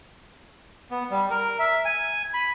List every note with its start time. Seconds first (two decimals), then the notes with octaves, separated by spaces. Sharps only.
0.91 B3
1.11 G3
1.31 A#4
1.59 E5
1.85 G#5
2.34 B5